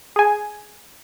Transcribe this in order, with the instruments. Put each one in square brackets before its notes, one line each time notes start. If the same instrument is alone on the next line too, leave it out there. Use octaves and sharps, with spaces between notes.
[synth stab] G#4 G#5